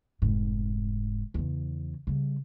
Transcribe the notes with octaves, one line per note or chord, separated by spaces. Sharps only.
F1 G#2
E2 C#3
C#3 G3